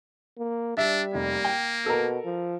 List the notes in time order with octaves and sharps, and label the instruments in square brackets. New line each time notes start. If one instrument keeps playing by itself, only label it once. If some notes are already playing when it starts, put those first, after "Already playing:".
[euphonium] A#3
[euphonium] G3 [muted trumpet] D4 [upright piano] E5
[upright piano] F1 [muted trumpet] A#3
[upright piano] G5
[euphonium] B2 [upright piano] A4 A#4
[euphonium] F3